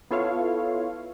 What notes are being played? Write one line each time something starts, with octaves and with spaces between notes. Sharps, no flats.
B3 E4 F4 A4 C#5 F5